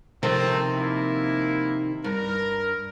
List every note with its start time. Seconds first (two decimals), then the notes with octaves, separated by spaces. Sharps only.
0.23 C3 D#3 F3 A3 C4
0.77 A#3 E4
2.04 G2 A#4